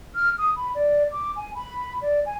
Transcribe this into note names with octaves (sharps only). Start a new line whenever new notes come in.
F6
D#6
B5
D5
D6
G#5
B5
D5
G#5